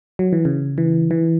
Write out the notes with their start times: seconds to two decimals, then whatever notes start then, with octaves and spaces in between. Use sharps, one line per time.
0.19 F#3
0.33 E3
0.45 C#3
0.78 E3
1.11 E3